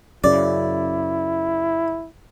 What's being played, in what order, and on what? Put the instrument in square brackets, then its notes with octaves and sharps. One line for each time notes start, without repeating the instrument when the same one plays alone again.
[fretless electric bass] F#2 C#3 [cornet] E4 [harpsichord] D5